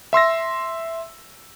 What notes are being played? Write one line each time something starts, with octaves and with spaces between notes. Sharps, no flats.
E5 C6 E6 A#6